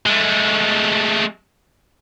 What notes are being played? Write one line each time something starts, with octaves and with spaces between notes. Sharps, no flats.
G#3 A3